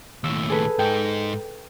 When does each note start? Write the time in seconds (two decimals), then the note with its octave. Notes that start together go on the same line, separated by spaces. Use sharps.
0.24 D#2 A2 E6
0.49 G#4 A4 B4
0.79 G#2 D#4 G5